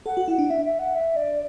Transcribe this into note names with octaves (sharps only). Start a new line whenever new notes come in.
A4 F#5
F#4
E4 F#5
D4
D4 E5
E5
F#5
E5
D5